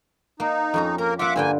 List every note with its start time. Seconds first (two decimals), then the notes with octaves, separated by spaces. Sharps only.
0.40 A#3 D#4
0.74 F2 C#4 A#5
0.98 A#3 A#4 A#5
1.19 A#3 F4 E5 F#5 D6
1.36 G2 D3 A#3 G5 G#5